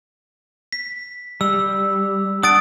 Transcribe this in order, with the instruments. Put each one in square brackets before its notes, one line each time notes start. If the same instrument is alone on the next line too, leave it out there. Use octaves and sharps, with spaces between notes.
[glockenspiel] B6
[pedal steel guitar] G3 [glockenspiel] E6
[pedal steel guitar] D4 F#5 [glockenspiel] D#6 A6 D7